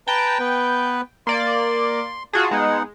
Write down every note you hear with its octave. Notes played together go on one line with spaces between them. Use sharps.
B4 G5 A5 A#5
B3 B4
A#3 D5 C6
F4 F#4 G#4 A5
G#3 B3 D#4 F#5